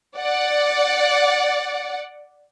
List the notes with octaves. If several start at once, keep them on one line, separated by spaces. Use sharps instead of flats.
D5 F#5